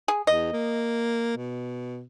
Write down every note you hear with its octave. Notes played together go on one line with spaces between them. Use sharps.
G#4
E2 D#5
A#3
B2